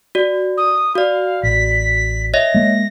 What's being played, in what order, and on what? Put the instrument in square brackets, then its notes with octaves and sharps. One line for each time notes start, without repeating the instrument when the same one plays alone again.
[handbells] F#4 D5
[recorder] D#6
[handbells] F#4 D5 [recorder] F5
[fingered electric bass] A1 [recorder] B6
[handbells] C#5 D#5 E5 [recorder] A#6
[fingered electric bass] G#3 A#3